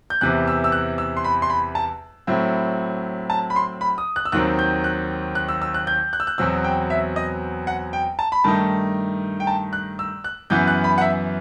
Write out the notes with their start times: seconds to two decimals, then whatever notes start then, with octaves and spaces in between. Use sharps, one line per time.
0.10 G6
0.21 E2 C3 E3 F#6
0.47 E6
0.64 E6
0.72 F#6
0.98 E6
1.17 C6
1.24 B5
1.42 C6
1.50 B5
1.75 A5
2.27 A2 F#3 C4 E4
3.30 A5
3.50 B5
3.56 C6
3.81 B5
3.98 D#6
4.16 F#6
4.25 E6
4.32 D#2 D#3 F#3 C4 F#6
4.59 G6
4.84 F#6
5.35 F#6
5.49 E6
5.62 E6
5.74 F#6
5.87 G6
6.13 F#6
6.20 E6
6.27 F#6
6.38 E2 B2 F#3 C4 E6
6.64 G5
6.90 E5
7.16 D#5
7.67 F#5
7.93 G5
8.19 A5
8.32 B5
8.44 G2 D#3 A3 D#4 A5
9.40 G5
9.47 A5
9.73 F#6
9.99 E6
10.24 F#6
10.50 F#2 E3 B3 E4 G6
10.68 F#6
10.84 B5
10.98 F#5
11.01 E5